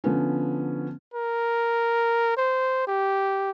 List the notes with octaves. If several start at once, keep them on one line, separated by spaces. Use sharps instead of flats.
D3 F3 B3 C#4
A#4
C5
G4